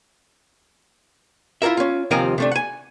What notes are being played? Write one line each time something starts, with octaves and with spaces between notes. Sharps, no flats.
E4 F4 G#4 A#4 E5
C#4 F4
D#2 C3 F3 D#4 A#4 G#5
C3 A3 D4
F#5 G#5